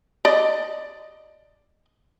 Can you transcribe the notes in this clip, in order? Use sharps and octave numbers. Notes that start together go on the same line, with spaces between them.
D5 D#5